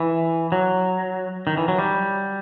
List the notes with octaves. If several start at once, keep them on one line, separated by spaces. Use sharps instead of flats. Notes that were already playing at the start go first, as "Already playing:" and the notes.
Already playing: E3
F#3
D#3
E3
F#3
G3